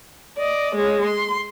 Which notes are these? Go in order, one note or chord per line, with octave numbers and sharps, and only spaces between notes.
D5 D#5
G#3 C#5
C6